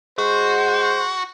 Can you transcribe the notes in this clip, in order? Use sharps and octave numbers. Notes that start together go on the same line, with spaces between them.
G#3 F#4 C5